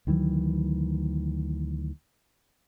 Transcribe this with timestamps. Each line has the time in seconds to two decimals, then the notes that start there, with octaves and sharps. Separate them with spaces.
0.07 D2 D#3 E3 F#3